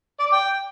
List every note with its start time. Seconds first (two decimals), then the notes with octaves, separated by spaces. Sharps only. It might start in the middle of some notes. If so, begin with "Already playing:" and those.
0.20 D5
0.26 D6
0.33 G5